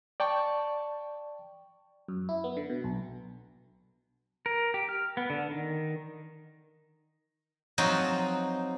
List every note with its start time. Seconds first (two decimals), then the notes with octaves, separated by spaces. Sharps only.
0.20 D5 G5 A5 C#6
2.08 F#2
2.29 E4
2.44 B3
2.57 D3
2.70 B2
2.84 B1
4.46 A#4
4.74 G4
4.89 F6
5.17 B3
5.30 D3
5.51 D#3
7.78 F3 F#3 C4 D#4 F#4